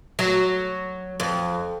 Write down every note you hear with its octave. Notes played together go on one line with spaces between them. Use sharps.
F#3
F2